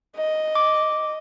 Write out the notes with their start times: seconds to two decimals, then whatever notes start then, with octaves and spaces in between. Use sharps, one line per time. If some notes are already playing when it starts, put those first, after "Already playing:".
0.17 D#5
0.55 D6